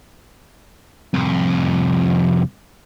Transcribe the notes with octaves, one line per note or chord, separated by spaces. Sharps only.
C2 F2